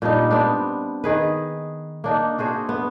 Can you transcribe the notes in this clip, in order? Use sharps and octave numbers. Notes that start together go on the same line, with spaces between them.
A#2 G3 D4 D#4
B3 C4 D4
D#3 G#4 B4
A#3 D4 D#4
D4 F#4 G#4 C5
B3